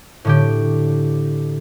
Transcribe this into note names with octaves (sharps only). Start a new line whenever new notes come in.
A2 D3 G4